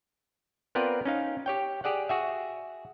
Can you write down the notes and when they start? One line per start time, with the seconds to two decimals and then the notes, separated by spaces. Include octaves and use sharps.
0.75 B3 C4 F4 A#4 B4 D5
1.05 C#4 D#4 F5
1.46 G4 C#5 G5
1.84 G4 G#4 D5 F#5
2.09 F#4 G#4 E5